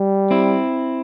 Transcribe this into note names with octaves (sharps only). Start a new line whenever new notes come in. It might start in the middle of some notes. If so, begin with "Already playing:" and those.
Already playing: G3
C4 E4